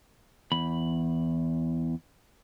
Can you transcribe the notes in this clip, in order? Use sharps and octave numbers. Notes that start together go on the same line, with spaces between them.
E2 B5